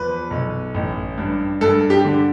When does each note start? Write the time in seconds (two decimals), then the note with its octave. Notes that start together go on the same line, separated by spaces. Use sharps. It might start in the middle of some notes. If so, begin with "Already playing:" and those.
Already playing: E2 F3 B4
0.31 B1
0.74 A1
1.18 G2
1.61 G2 A4
1.90 G4
2.05 D3